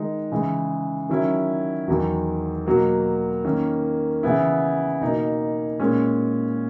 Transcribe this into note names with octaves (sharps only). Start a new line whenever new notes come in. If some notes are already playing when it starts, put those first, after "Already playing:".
Already playing: D#3 G#3 D#4
C#3 E3 G#3
D#3 F#3 C#4 E4
E2 D#3 F#3
B2 F#3 A#3
D#3 A#3 C#4
C#3 E3 B3 E4
B2 A#3 D#4
A#2 G#3 C#4